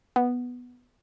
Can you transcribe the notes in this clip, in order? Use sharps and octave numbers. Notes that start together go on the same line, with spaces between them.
B3